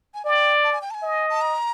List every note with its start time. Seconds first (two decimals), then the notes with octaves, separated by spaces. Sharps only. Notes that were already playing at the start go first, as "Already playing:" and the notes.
0.14 G#5
0.25 D5 G#5
0.30 G5
0.64 A5
0.73 G#5
0.82 G5
0.91 A5
0.94 G#5
1.03 D#5
1.30 A5
1.41 A#5